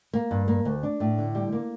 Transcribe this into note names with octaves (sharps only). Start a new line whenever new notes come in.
A#3
G2
A#3
D2
D4
A2
D3
G3
A#3